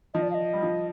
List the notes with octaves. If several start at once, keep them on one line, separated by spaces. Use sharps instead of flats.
F3 D#5
D5
F5
D#5
G3
F3